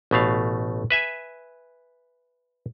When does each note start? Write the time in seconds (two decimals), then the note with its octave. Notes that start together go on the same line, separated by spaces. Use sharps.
0.11 A1 B2 A3 F5
0.90 B4 E5 G#5